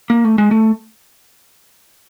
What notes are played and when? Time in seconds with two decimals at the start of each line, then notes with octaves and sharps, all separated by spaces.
0.10 A#3
0.24 A3
0.38 G#3
0.51 A3